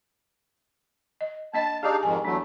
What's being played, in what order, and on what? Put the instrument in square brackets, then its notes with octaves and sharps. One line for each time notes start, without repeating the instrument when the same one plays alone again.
[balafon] D#5
[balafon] A#3 D4 D#5 [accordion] A5
[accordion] D4 D#4 F5 [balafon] G4 G#4
[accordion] F2 G#2 D#3 [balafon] G#5
[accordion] E2 F#3 A3 [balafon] D4